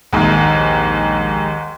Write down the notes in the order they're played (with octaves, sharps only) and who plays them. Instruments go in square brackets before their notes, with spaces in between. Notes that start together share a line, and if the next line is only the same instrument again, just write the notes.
[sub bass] A#1 [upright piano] D#2 G#2